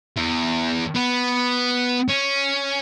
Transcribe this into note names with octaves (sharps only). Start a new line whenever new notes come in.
E2
B3
C#4